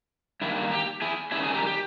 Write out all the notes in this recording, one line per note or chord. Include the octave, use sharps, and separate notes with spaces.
G2 D#3 A#3 E4
G4
E4 G#4
D#3 G3 C#4 E4 G#4
G#4
G4 A#4
G4